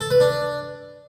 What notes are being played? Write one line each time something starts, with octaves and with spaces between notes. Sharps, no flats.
A4
B4
D4